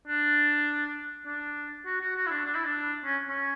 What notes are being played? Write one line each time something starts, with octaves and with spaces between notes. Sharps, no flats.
D4
D4
F#4
F#4
F#4
E4
D4
D4
E4
D4
C#4
C#4